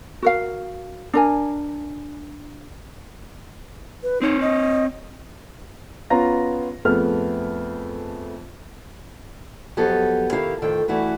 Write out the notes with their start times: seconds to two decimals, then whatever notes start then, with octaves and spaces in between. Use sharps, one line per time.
0.22 F#4 A#4 F5
1.14 D4 A#4 G#5
4.03 B4
4.22 C4 D#4 C#5
4.41 D#5
6.10 B3 C#4 F4 A#5 A#6
6.85 F2 A3 B3 G#4 F6
9.77 F2 F#3 B3 G4 A4
10.33 D#3 E4 G4 A#4 F5
10.62 F2 A2 D#3 A4 G5
10.88 G2 E3 A3 E4 F#4 B4